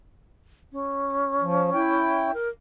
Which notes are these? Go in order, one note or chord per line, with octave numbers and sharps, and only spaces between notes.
C#4
F3
E4 G5
A#4